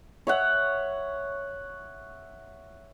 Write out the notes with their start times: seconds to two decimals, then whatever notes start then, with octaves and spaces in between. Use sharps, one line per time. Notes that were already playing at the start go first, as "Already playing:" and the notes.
0.27 C#5 E5 F#5